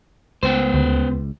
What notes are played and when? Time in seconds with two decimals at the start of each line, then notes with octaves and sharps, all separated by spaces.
0.43 C#2 B3 C5
0.74 D2